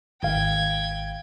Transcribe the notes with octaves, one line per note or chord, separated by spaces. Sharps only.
G#1 F5 G5 G#6